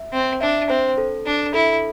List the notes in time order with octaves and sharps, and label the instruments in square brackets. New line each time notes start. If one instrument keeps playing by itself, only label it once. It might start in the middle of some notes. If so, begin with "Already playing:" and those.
Already playing: [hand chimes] E5
[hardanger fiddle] C4
[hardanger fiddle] D4 [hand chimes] E5
[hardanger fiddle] C4 [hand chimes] C5
[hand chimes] A4
[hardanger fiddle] D4
[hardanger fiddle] E4 [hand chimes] A4